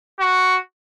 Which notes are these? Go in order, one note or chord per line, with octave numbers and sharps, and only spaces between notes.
F#4